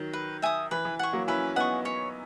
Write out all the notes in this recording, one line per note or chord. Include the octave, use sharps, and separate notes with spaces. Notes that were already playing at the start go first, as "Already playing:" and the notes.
Already playing: D#3 F#3
B4
E5 G#5 D#6
E3 B4
E3
F#5 C#6
F#3 A#3
C#4 E4 B4
B3 D#4 F#5 C#6
C#5